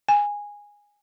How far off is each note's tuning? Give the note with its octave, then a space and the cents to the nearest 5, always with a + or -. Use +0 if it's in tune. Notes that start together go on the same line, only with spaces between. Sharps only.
G#5 -15